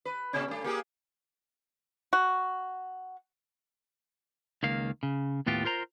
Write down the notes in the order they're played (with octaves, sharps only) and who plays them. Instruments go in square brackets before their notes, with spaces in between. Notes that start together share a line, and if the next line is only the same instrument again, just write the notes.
[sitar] B4
A#2 C#3 C#4
G2 A3
A#3 G4 G#4
[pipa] F#4
[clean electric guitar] C#2 D#3 A#3 F5
C#3
D#2 A2 B3 F4 G4
F4 A#4 C5 A#5